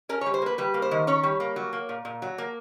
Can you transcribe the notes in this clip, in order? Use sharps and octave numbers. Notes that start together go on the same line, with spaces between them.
C#4 A#4
G3 C#5
C5
A#3 B4
G3 B4
A#3
C5
D#3
C#4 C#5
G3
A#3
F#3
A#3
A#2
A#2
F#3
A#3